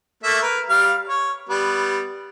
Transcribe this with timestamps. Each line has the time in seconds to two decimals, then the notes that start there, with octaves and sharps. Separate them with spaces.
0.23 A3 A#3 E5
0.43 A#4 B4
0.69 G3 F5 F6
1.09 C#5
1.49 G3 B3